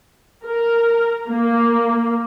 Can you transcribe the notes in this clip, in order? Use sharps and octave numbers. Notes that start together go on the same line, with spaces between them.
A#4
A#3